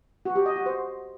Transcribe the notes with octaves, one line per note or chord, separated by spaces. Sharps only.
F#4
G4
D#5
F#4
C5